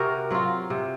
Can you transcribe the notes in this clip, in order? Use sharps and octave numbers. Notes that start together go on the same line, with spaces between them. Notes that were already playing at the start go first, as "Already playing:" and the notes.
Already playing: C3 F#4 A#4
F#3 C4 F4
C3